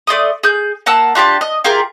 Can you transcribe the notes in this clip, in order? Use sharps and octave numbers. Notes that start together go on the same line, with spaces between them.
A3 D5 C6 D#6
G#4 G6
A#3 F#5 A5 E6
D4 F4 G4 A5
D#5
F4 G4 G#4 A#4